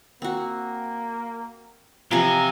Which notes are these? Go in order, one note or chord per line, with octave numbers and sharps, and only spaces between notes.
A#3 C4 F#4
C3 E3 F3 G#5 A#5